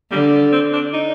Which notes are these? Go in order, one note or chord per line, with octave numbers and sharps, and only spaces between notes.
D3 G3
C4
D4
D#4